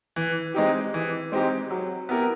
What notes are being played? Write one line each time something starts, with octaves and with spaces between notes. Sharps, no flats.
E3
G#3 C4 D#4 G4
E3
G#3 C4 D#4 G4
F#3
B3 E4 G4 A#4